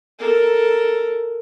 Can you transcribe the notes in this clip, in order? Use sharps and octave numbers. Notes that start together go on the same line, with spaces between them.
A4 A#4